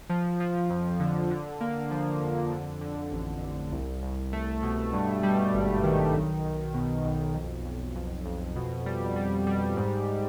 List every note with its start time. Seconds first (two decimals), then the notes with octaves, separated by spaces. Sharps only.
0.09 F3
0.40 F3
0.70 F2
1.00 D3
1.31 D3
1.61 A#3
1.91 F3
2.21 F2
2.52 D3
2.81 D3
3.12 A1
3.42 A1
3.72 C2
4.03 C2
4.33 A3
4.63 B2
4.93 G2
5.23 G3
5.54 G#1
5.84 D#3
6.14 B1
6.44 B1
6.74 B2
7.05 B1
7.35 F2
7.65 F2
7.95 F2
8.25 F2
8.56 B2
8.86 G3
9.16 G3
9.47 G3
9.76 G#2